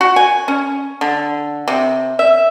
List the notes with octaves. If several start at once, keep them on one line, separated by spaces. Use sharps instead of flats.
F#4
G#5
C#4
D3
C3
E5